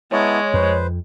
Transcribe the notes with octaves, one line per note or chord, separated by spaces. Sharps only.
G#3 B3 E4 C#5 A5
F2 B4 C5